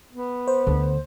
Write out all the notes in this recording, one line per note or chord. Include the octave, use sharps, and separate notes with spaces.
B3
C5
D2 D3